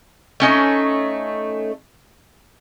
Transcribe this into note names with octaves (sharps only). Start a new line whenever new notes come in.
A3 C#4 D#4